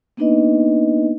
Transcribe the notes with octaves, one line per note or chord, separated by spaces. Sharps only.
A#3 B3 D4 D#4 B4 D#5